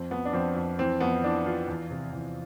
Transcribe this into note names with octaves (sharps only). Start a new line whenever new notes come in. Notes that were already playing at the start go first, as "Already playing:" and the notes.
Already playing: F2 C4
F2 B3
D4
F2 C4
F2
E3 C4
F2 B3
E3 D4
E3 F4
E2
C3
E2